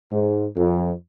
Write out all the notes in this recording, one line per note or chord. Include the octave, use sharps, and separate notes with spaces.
G#2
F2